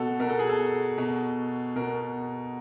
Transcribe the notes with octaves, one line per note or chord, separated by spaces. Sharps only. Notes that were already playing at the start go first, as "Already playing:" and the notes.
Already playing: B2 F#4 A4
B2 A#4
A4
G#4
A4
B2
B2 A#4